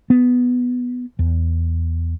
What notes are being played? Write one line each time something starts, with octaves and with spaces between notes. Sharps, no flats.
B3
E2